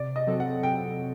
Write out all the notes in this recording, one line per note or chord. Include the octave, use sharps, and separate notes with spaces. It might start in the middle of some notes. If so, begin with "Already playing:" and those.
Already playing: C3 D5
D#5
F#3 C4 F#4 A4
F#5
C3 G5